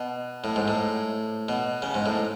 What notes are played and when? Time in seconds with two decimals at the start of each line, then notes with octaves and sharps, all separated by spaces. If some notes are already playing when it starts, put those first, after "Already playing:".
Already playing: B2
0.44 A2
0.56 G#2
0.68 A2
1.49 B2
1.82 C#3
1.94 G#2
2.06 A2